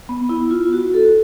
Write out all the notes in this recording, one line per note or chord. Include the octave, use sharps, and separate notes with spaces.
B3
E4
F4
F#4
A4